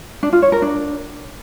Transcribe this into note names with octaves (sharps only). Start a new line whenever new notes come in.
D4
F4
C#5
A#4
D4